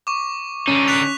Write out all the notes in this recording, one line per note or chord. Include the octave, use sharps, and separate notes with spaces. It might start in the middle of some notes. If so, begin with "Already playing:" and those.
C#6 D6
D3 C#4 D#4
F#6 B6 F7